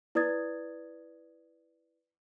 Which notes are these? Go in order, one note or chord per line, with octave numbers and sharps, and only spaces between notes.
E4 B4 D5 D#6 G#6 A6